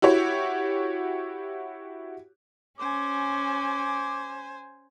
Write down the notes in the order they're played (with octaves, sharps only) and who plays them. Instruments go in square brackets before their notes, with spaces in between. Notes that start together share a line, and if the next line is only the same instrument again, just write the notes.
[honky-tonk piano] E4 F#4 G4 C#5
[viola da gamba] C#4 [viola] C5 G#5 [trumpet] D6